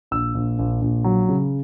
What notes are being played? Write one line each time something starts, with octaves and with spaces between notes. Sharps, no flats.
A#1 E6
A#1
A#1
A#1
F#3
C#3